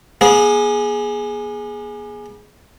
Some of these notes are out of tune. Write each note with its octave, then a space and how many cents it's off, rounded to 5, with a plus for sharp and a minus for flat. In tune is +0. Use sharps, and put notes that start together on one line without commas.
B3 -45 G#4 +5